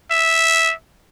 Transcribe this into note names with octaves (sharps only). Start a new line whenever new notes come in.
E5